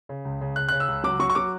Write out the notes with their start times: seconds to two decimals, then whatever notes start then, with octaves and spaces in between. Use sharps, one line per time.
0.09 C#3
0.25 C#2
0.41 C#3
0.56 C#3 F#6
0.69 C#3 F#6
0.80 E6
0.88 C#2
1.04 F#3 D6
1.20 F#3 C#6
1.30 C#6
1.35 F#3 D6